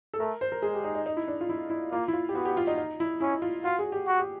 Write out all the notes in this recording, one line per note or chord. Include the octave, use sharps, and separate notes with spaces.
A4
A3 A#4
C5
A#4
G#3 G#4
G4
D#4
D#4
D#4
E4
D4
F4
E4
E4
A#3 F4
E4
F4
G4
B3 F#4
G4
F4
D#4
D#4
E4
C#4 E4
F4
F4 F#4
G#4
G4
F#4
G4